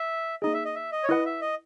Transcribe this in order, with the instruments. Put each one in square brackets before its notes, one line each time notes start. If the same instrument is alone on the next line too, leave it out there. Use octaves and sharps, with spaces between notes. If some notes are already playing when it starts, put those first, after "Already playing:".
Already playing: [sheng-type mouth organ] E5
[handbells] A#3 D#4 G#4 [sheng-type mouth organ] D#5
[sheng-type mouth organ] E5
D#5
E5
D#5
C#5
[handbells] E4 B4 F#5 [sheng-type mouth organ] D#5
[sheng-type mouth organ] E5
D#5